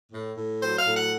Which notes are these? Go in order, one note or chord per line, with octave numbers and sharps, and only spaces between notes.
A2
A2
F#3 C5
F5
A2
F#5